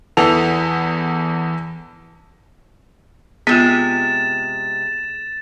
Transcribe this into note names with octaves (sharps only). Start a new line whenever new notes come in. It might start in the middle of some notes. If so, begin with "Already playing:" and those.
E2 E3 A4 F7
C3 G#3 B3 F4 A6 E7